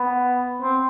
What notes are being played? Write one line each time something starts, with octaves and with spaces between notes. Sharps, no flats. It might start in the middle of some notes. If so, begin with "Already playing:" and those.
Already playing: B3
C4